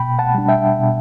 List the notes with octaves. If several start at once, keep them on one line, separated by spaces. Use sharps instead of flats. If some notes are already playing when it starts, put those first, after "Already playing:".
Already playing: B2 G5 B5
F#5 A5
G3 D4
E5 G5
B2